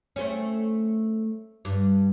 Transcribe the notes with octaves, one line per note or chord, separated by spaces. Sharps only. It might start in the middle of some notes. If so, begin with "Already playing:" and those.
A3 C4 C#4
G2